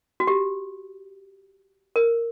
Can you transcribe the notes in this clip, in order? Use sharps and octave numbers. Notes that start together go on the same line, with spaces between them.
F#4
G4
A#4